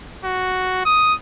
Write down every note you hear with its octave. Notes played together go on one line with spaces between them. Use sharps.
F#4
D#6